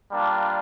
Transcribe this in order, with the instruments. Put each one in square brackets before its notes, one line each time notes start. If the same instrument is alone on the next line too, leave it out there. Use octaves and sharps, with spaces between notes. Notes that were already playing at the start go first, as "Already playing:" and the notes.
[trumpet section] G3 A#3 D4 F4